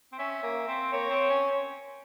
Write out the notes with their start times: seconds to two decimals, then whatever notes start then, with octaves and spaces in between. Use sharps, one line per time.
0.12 C4
0.18 C#4 E5
0.43 A#3
0.67 C4
0.92 A#3 C#5
1.10 C4
1.29 C#4